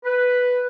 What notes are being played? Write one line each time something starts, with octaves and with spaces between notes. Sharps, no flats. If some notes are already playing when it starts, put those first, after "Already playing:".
B4